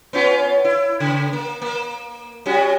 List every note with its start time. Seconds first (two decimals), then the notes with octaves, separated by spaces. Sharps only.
0.13 B3 C#4 F4
0.64 E4
1.00 C#3
1.33 A#3
1.62 A#3
2.46 G3 C#4 F#4